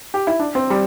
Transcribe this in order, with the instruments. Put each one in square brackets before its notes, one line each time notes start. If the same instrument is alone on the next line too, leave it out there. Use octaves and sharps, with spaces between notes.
[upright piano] G4
E4
D4
C4
G3